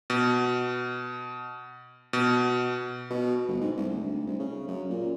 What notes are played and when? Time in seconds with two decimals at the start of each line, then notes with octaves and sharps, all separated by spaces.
0.10 B2
2.13 B2
3.10 B2
3.48 G1
3.61 G#2
3.77 C2
3.90 D2
4.26 C2
4.39 C#3
4.68 F#2
4.90 A#2